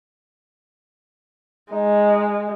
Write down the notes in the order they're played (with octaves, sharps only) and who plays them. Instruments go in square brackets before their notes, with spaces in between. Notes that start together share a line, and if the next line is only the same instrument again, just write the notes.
[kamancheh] G#3 [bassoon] D#4